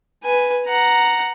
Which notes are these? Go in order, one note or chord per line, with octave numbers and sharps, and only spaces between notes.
B4 G#5
F#5 A#5